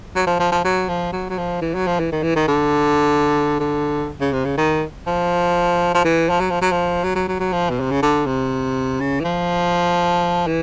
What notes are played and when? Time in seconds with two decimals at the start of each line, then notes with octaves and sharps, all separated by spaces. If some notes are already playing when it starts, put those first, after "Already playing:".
0.15 F#3
0.27 F3
0.39 F3
0.52 F3
0.64 F#3
0.88 F3
1.13 F#3
1.30 F#3
1.38 F3
1.62 E3
1.74 F#3
1.87 F3
2.00 E3
2.12 D#3
2.23 E3
2.36 D#3
2.48 D3
3.59 D3
4.21 C#3
4.33 C3
4.45 C#3
4.57 D#3
5.07 F3
5.94 F3
6.04 E3
6.29 F3
6.40 F#3
6.50 F3
6.61 F#3
6.72 F3
7.04 F#3
7.15 F#3
7.28 F#3
7.40 F#3
7.53 F3
7.70 B2
7.80 C3
7.91 C#3
8.02 D3
8.26 C3
9.00 C#3
9.20 E3
9.24 F3
10.47 E3